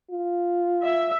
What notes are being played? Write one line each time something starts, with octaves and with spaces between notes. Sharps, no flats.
F4
E5